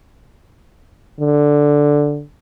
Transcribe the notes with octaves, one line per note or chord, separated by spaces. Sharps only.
D3